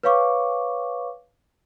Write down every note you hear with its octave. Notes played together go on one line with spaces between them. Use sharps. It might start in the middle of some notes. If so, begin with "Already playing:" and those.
B4 C#5 F5 C#6 D6